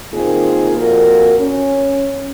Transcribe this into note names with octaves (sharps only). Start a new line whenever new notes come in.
D#3 A#3 C4 F4 G#4
F2 A#2 F#4 A#4
C#4